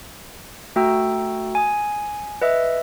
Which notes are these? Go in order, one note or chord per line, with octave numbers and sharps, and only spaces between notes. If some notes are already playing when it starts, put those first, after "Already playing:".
A3 F#4 G5 A#5 E6
G#5 D#6
B4 D#5 E5 E6